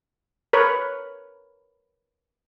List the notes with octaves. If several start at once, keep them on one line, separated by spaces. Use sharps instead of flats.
A#4 B4 C#5